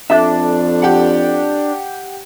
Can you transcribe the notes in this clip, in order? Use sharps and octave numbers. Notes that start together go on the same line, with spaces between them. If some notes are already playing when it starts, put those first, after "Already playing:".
F2 D4 A4 E5
G4 F#5